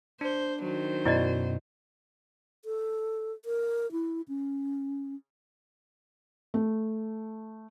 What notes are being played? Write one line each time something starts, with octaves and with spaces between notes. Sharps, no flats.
D4 C5
D#3 F#3 C5
F#2 B2 E4 D5 D#5
A4
A#4
E4
C#4
A3